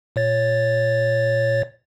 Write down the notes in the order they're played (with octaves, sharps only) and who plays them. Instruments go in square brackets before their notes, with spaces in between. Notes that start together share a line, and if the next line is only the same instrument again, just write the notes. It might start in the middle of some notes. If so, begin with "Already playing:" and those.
[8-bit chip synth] A#2 C#5 A6